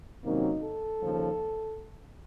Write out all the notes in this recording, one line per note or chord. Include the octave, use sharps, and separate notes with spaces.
C3 D#3 F#3 A#3 C#4 D#4
A4
D#2 C#3 F3